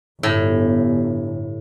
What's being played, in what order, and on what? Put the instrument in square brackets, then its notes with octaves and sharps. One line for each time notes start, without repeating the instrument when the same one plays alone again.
[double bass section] G1 [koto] A2